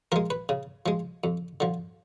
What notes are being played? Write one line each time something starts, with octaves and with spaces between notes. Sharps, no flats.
F3 G#3 A#4
B4
C#3
F3 G#3
F2
D3 F3